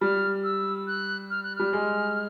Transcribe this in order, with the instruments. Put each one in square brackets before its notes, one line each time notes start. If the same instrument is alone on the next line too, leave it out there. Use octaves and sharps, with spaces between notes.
[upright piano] G3 [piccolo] F6
[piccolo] E6
F#6
F6
F#6
[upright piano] G3 [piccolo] F6
[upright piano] G#3